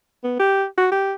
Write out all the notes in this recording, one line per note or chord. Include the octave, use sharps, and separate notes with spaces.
B3
G4
F#4
G4